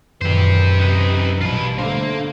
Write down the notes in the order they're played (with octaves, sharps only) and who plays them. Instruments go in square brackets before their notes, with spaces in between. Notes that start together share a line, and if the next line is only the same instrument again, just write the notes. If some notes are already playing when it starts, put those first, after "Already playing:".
[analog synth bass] F#2 [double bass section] A#2 D#3 [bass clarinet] E3 [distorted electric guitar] G4 C5
[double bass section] C3 [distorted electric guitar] D#4 B4
[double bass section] A#1 G2 [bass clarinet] B2 [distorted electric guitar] F4 B5
[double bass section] D3 A3 [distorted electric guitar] A#3 [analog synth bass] D4 [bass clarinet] C5